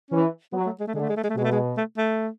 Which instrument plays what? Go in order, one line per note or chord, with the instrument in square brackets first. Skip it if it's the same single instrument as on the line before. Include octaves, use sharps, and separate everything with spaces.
[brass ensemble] E3 [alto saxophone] C#4
[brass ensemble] F#3 [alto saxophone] B3
[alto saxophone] A3
G#3
A3
[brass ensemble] D3 [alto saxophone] G#3
[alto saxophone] A3
G#3
A3
G#3
A3
[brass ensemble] B2 [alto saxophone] G#3
[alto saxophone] A3
G#3
A3
A3